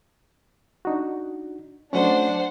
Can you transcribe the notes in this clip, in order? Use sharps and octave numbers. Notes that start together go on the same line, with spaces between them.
D4 D#4 F#4
F#3 A3 C#4 D4 C5 F#5